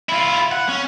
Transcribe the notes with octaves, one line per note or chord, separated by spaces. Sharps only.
E4 F4
F#5
C#4